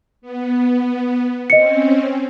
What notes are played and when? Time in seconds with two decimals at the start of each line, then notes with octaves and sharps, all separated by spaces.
0.22 B3
1.50 C4 C#4 D#5 C#7